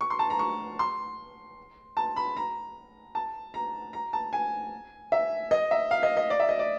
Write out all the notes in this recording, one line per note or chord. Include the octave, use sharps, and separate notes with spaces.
C#6
C6
A5
A#5
C#6
C6
A5
B5
A#5
A5
A#5
A#5
A5
G#5
E5
D#5
E5
F5
D#5
D#5
D5
E5
D#5
D5